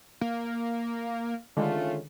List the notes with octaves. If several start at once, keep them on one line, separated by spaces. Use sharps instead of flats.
A#3
D3 D#3 G#3 A3 C#4 F4